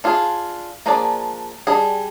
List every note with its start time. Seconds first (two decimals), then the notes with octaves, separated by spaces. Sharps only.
0.04 D4 F4 G#4
0.86 F3 A#3 D4 G#4 D5
1.67 G3 D4 G#4 D#5